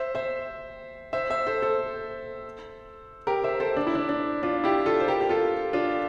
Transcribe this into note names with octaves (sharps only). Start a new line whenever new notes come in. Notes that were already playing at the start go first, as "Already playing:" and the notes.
Already playing: C5 E5
C5 E5
C5 E5
C5 E5
A4 C5
A4 C5
G4 A#4
C5 E5
A4 C5
D4
E4
D4
D4
D4 F4
E4 G4
F4 A4
C5
G4 A#4
G4
F4 A4
D4 F4